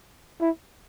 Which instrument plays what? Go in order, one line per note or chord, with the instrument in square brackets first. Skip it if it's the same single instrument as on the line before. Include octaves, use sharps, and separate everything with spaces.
[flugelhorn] E4